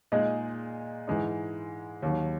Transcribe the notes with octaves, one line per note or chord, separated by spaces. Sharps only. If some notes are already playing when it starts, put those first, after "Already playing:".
A#2 G#3 D#4 G#4 D#5
G#2 E3 G#3 D#4
D#2 D#3 F#3